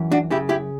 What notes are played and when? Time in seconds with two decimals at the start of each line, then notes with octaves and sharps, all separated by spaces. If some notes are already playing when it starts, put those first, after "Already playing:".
Already playing: F#2 E3
0.12 D4 F#4
0.30 C#3 E4 G4
0.49 E4 G4